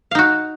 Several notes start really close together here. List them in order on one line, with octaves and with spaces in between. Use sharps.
F5 D#4 F#4